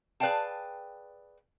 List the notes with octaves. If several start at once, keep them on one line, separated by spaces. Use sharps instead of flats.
G#4 B4 D5 F5 G5 A5